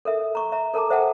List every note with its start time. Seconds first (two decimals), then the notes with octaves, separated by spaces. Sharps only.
0.05 A4 A#4 E5
0.35 A#5 C#6
0.52 E5 A#5
0.74 A4 A#4 A5 A#5 D6
0.90 A4 C5 E5 F#5 G5 A5